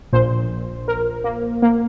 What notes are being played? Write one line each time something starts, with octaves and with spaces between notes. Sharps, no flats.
A#1 A#2 C5
A#4
A#3
A#3